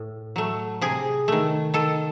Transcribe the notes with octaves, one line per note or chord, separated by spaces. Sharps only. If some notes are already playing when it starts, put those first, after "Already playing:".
Already playing: A2
F#3 A3
C3 G#4
D#3 A3
D#3 A4